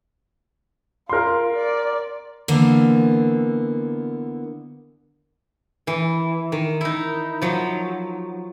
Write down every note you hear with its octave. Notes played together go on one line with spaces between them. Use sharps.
F4 A#4 C6
D5
D3 E3 A#3 B3
E3
D#3
D#4 E4
F3 F#3